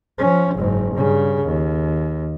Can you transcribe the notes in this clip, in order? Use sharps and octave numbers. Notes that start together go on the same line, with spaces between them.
F3 C#4
F#1 G#2
G2 C#3
D#2